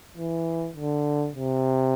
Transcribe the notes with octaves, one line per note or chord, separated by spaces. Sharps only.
E3
D3
C3